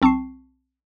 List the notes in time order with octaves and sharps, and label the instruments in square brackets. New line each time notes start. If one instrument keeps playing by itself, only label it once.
[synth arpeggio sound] B1 C4 A5 C#6 C7